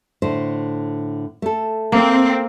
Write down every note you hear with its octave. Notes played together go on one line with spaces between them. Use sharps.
A2 D3 C5
A3 A4
A#3 C4